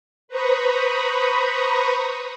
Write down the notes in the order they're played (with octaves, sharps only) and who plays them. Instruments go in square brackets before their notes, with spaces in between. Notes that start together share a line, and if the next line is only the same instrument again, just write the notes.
[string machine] B4 C5 A#5 B5 C#6 D#6